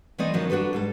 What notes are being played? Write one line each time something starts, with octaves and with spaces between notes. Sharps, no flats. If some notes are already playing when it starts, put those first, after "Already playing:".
E3 A3 C4 D5 D#5
D#3 F3 F#3 C#4
D4 F#4 G4 A4 B4
G#2 G3 A4